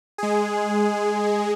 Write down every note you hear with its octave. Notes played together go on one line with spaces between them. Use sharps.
G#3 G#4